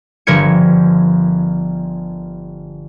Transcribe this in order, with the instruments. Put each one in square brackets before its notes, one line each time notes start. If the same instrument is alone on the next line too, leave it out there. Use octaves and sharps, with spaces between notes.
[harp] G1 F3 G3 A#4 G#6 C#7